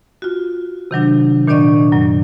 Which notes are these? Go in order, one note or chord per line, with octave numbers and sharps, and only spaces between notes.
F4 F#4
C3 D#3 F#3 D4
A#2 D#3 D4 D5 D#5 C#6
F#2 F#3